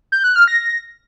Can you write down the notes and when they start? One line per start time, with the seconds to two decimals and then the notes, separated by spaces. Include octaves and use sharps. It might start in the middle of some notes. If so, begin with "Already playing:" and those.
0.12 G6
0.24 F#6
0.36 F6
0.48 A#6